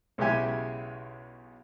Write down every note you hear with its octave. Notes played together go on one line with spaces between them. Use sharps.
B1 C#3 G#3 E4 G4 G#5